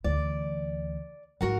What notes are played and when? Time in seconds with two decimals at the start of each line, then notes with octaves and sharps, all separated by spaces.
0.04 D2 E3 D5
1.41 G#2 F3 F#4 A#4 F#5